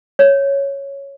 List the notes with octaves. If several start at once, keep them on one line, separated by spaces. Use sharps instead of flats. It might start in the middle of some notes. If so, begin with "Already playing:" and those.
C#5